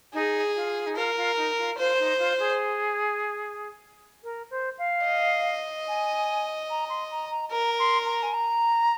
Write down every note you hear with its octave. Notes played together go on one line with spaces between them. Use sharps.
D#4 G#4
F4
D#4
F4 A#4
F4
D#4
F4
F4 C5
D#4
F4
G#4
A#4
C5
F5
D#5
G#5
A#5
C6
A#5
A#5
A#4 A#5
C6
A#5
G#5
A#5